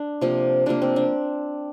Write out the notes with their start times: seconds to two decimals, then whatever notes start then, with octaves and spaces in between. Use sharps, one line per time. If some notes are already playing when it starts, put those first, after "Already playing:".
Already playing: D4
0.21 C3 F3 A#3
0.66 C3 F3 A#3 D4
0.82 C4
0.96 D4